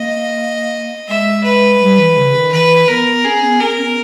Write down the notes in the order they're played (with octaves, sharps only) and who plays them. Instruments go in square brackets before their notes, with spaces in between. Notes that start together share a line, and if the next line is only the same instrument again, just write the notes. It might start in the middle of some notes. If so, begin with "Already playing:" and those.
Already playing: [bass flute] A#3 [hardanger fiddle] D#5
[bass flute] G#3 [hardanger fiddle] E5
[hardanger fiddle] B4
[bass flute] G3
E3
C#3
D#3
[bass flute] E3 [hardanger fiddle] B4
[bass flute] B3 [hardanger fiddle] A#4
[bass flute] C#4 [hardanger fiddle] G#4
[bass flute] B3
[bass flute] C#4 [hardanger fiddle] A#4
[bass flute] B3